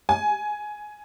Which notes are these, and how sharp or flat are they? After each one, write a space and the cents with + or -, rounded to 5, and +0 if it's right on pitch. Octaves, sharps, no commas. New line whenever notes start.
G#5 +10